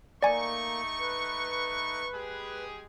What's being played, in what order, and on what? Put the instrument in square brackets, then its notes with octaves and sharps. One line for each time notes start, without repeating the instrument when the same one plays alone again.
[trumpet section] A3 D#4 C#6 [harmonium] A#3 [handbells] D5 G#5
[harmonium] B4
[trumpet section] G#3 G4 G#4